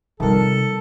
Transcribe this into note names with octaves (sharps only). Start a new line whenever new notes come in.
C3 D#3 F3 G3 A4 A#4